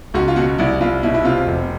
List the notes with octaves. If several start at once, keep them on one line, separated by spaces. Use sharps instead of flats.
C#2 F#4
F4
B2 F#4
C2 E4
C2 F4
B2 E4
E4
C3 F4
F1